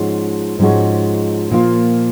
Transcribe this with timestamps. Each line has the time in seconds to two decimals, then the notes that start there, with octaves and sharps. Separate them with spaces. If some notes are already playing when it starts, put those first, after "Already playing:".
Already playing: G#2 F3 G#3 C#4 F#4
0.59 G#2 F3 G#3 C#4 F#4
1.51 A#2 F3 A#3 F4